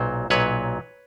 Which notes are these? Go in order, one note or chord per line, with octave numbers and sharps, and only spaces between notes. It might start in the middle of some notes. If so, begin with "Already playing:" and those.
Already playing: B1 A#2 F#3 C5
B1 A#2 F#3 B4 C#5